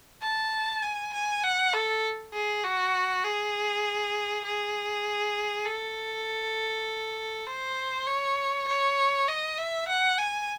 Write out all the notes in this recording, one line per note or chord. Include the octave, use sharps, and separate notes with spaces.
A5
G#5
G#5
F#5
A4
G#4
F#4
G#4
G#4
A4
C5
C#5
C#5
D#5
E5
F#5
G#5